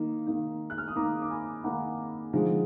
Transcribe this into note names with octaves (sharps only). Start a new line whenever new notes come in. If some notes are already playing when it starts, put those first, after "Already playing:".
Already playing: D#3 A#3 D#4
D#3 A#3 D#4
F#6
F6
D#6
D#3 A#3 D#4 A#5 D6
D6
G#5 B5
D#3 A#3 D#4 F#5 A#5
D3 F3 G#3 D#4